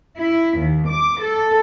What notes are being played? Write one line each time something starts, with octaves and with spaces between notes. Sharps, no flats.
E4
D#2
D6
A4